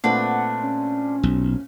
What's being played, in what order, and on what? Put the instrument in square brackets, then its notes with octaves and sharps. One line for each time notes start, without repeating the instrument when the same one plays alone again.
[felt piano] A#2 A3 C4 [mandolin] D4 B4 [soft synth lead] F#5
[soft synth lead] C#4
[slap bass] B1